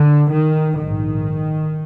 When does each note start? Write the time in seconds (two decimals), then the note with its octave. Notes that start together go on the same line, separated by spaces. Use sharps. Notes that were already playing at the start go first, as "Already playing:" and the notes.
Already playing: D3
0.32 D#3
0.79 A#1 G#2 D#3